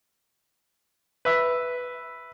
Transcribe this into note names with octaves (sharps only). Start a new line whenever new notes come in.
B4 E5